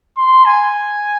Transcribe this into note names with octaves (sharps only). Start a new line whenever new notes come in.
C6
G#5